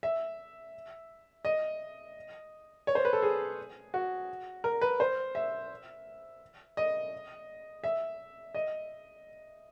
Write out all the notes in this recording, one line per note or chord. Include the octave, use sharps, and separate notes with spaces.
E5
D#5
C#5
C5
B4
A4
G#4
F#4
A#4
B4
C5
E5
D#5
E5
D#5